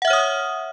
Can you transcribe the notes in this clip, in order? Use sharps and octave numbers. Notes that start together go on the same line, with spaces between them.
C#5 E5 F#5 D#6 F6